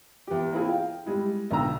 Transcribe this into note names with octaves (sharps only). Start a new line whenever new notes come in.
E2 G4
A#3 C4 E4 F4 G#4
F5 G5
G3 G#3 E4
B1 D3 G5 A#5 E6